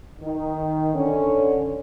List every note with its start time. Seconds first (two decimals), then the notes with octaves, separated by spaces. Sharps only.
0.20 D#3
0.94 D3 C#4